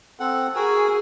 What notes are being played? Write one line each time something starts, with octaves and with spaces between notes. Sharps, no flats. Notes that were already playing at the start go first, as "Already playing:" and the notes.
C4 A4 F#5
F#4 G#4 A#4 E6